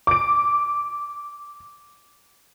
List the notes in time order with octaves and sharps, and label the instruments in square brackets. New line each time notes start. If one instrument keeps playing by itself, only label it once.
[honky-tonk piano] D6 D7